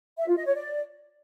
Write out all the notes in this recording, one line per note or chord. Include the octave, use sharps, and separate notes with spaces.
E5
F4
D#5
C#5
D5